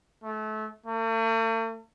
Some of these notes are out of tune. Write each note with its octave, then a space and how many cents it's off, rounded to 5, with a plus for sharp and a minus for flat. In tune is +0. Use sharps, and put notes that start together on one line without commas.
A3 -30
A3 +45